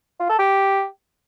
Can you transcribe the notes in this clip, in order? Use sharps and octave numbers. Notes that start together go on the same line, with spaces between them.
F4
A4
G4